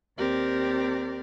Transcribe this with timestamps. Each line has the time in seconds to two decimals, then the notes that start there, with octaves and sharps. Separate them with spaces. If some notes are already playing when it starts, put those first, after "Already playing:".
0.17 D#2 C4 G4 A#4 D5